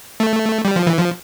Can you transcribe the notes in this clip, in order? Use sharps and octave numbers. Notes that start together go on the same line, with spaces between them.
A3
G3
F3
E3
F3